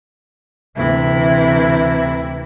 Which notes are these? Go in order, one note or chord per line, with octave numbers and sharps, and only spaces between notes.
D2 C3 E3 E4